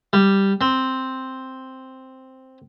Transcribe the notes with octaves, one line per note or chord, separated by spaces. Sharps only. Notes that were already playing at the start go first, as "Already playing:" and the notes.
G3
C4